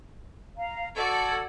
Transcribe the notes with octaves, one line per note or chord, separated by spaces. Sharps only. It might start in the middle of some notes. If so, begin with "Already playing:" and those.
F5 A#5
F#4 A4 D5 G#6